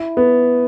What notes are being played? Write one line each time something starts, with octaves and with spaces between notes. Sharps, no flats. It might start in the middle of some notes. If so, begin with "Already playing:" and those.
Already playing: E4
B3